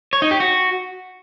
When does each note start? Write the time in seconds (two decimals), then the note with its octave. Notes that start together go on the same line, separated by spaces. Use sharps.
0.13 C#5
0.22 D#4
0.31 G4
0.40 F#4